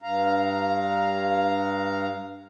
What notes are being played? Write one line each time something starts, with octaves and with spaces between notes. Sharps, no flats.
G2 F5 A#5